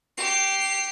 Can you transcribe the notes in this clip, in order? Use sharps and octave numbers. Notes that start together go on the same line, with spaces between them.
G4 C7
C7